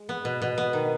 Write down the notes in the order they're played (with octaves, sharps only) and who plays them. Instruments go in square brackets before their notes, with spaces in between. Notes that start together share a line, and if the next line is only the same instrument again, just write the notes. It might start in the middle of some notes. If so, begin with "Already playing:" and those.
Already playing: [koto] G#3
B3
B2
B2
B3
D#3